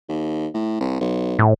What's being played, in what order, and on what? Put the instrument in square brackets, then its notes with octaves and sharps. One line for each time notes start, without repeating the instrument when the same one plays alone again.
[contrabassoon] D#2
A2
C2
B1
[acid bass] A2